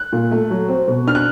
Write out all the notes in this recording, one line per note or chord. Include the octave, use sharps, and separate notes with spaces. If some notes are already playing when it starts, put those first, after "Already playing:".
Already playing: F#6
A#2
A3
F#3
C4
B2
D4 F6
F#6